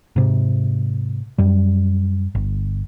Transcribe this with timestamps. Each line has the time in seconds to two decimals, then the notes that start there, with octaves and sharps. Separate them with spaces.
0.16 G#2 C3
1.38 F#2 G3
2.35 G1